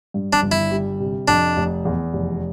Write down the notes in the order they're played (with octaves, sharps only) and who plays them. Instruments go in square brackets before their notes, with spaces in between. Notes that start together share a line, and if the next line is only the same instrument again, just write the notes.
[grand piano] G2
[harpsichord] D4
[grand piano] G1
[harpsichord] E4
[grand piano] G3
C3
[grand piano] F2 [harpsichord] D4
[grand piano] F1
E2
F1